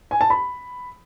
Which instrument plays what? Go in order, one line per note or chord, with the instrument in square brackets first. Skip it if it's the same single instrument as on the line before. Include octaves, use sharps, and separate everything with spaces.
[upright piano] G#5
A5
B5